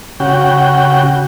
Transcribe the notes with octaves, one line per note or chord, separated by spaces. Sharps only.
C#3 F#4 G5